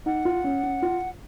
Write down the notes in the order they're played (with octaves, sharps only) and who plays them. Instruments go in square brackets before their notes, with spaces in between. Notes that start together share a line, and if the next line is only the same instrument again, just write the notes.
[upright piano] D#4 [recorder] F#5
[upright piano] F4
C#4
C#4
F4